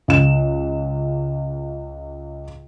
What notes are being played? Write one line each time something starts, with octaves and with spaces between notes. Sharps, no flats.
C#2 E7